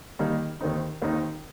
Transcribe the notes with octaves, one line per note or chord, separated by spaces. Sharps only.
D#3 G3 A#3 D#4 A#4
D#2 D#3 C4 D#4
D#2 D#3 C4 D#4